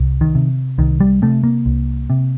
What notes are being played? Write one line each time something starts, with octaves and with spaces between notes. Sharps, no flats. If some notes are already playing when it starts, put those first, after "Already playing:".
Already playing: C2
D#3
C3
C2 D#3
G3
C3 A3
A#3
C2
C3